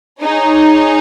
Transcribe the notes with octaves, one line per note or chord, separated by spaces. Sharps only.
D#4 G#4 C#5